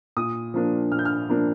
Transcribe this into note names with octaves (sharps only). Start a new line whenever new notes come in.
A#2 D#6
F3 A#3 D4
A#2 F6
G6
F6
F3 A#3 D4